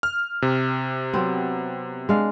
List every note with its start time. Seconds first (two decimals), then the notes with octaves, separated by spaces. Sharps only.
0.03 F6
0.42 C3
1.14 F#3 B3 C4
2.09 G#3 D4 F5